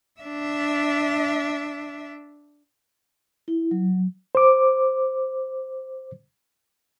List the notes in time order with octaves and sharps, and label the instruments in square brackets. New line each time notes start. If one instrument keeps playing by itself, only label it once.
[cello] D4 E5
[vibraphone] E4
F#3
[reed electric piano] C5 D6